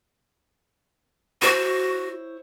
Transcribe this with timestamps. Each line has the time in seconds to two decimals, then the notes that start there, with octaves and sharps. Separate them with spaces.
1.42 E4 F#4 C5 C#5